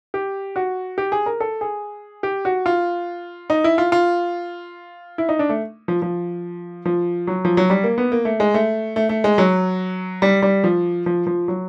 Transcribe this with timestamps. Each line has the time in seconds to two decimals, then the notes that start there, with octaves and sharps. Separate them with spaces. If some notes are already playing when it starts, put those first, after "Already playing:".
0.14 G4
0.56 F#4
0.98 G4
1.12 G#4
1.26 A#4
1.40 A4
1.61 G#4
2.23 G4
2.45 F#4
2.66 F4
3.50 D#4
3.64 E4
3.78 F4
3.92 F4
5.18 E4
5.29 D#4
5.39 D4
5.49 A3
5.88 F3
6.02 F3
6.85 F3
7.27 F#3
7.45 F3
7.57 F#3
7.70 G3
7.84 A#3
7.98 B3
8.12 A#3
8.25 A3
8.40 G#3
8.54 A3
8.96 A3
9.09 A3
9.24 G#3
9.38 F#3
10.22 G3
10.42 G3
10.64 F3
11.06 F3
11.27 F3
11.48 F#3